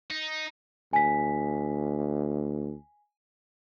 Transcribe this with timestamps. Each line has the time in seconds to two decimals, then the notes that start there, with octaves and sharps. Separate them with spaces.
0.10 D#4
0.93 D2 G#5 B6